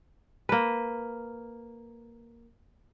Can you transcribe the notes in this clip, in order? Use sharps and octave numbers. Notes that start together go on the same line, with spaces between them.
A#3 B4